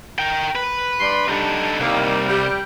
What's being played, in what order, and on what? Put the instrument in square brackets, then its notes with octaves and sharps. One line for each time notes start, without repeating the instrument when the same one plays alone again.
[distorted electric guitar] A#4 G5
B4
[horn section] G2 D5 C6
[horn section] G3 D4 [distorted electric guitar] D#4 A4
[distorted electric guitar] C2 [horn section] D#3 G3 A#3
[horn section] G3